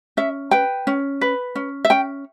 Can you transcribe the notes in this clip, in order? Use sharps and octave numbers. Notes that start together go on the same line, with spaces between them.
C#4 E5
B4 G5
C#4
B4
C#4
E5
C#4 G5